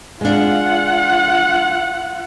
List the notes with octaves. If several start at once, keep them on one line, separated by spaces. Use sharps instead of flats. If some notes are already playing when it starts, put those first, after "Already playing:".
G#3 D4 F4 F#5